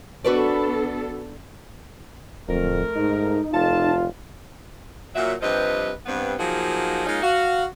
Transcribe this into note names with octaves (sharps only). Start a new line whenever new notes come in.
B3 D4 F#4 A4 B4 D5
D1 F2 A3 A#4
G#2 D#4
F1 F4 A4 A5
A#2 F#3 E5
G2 C3 F3 B4 C5 D#5
G2 B3 C4
F3 F#3 A#3 D#4 F#4 G#4
G#3 A#3 C#4 D#4 F4
F#4 F5